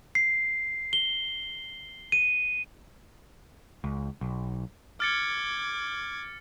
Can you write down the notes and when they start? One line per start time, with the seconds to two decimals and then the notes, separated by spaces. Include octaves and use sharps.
0.15 C7
0.93 G7
2.12 D#7
3.84 C#2
4.21 B1
5.00 D6 F6 G#6 A6 C#7